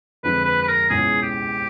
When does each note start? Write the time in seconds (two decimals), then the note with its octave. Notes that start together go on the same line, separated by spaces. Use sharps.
0.23 F2 D3 F3 G#3 B4
0.45 B4
0.63 B4
0.68 A#4
0.90 C#2 B2 G#3 C#4 E4 G#4
1.23 G4